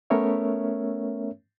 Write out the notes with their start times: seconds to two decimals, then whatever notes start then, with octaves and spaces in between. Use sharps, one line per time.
0.10 A3 B3 C#4 A#4 C#5 E5